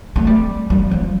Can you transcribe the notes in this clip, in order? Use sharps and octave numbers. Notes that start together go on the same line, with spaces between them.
A3
G3
G3
F3